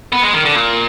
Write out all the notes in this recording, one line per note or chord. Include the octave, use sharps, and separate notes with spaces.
B3
G#3
D#3
D3
A#2